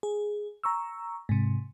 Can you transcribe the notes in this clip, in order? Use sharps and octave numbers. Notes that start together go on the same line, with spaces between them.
G#4
A#5 C#6 E6
G#2 C3